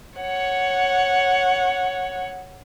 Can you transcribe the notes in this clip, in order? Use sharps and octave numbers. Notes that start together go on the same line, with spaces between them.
C#5 F#5